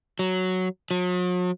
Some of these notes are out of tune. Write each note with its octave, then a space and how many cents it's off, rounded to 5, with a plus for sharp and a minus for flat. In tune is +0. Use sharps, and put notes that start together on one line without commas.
F#3 +0
F#3 -45